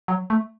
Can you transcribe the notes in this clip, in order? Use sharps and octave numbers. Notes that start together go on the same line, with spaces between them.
F#3
A3